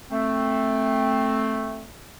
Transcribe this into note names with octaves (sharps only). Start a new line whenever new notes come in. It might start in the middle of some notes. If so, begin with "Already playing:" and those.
A3 C4